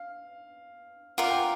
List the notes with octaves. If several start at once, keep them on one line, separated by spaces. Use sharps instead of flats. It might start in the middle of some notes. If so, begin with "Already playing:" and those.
Already playing: F5
F4 A#4 D5 F5 F#5
G5